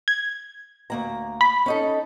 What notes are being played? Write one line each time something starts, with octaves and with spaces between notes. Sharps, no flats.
G#6
D2 A#3 A#5
B5
C#4 D#4 A4